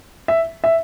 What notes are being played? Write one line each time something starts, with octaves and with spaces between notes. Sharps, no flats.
E5
E5